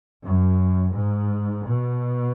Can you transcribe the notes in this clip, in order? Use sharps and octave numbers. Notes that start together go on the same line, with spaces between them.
F#2
G#2
B2